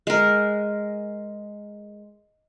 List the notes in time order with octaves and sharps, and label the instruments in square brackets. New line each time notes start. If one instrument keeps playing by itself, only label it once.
[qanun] G#3 A#4